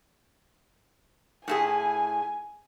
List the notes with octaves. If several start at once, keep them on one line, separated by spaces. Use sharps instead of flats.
A2 E4 G#4 G#5